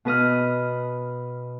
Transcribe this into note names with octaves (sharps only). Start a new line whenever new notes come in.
B2 B4 D#5 F6